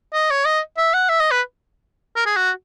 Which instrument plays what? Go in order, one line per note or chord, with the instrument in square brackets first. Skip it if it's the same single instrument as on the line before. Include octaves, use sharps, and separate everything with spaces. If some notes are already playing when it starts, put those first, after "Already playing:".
[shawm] D#5
C#5
D#5
E5
F#5
E5
D#5
B4
A#4
G#4
F#4